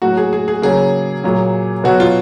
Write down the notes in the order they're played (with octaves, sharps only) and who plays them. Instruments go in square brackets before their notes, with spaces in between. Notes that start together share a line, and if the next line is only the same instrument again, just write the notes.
[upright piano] A2 F#3 A#3 F#4
G#4
G#4
G#4
C#3 F#3 A#3 G#4
A#2 F#3 A#3
B2 F#3 B3 F#4
F4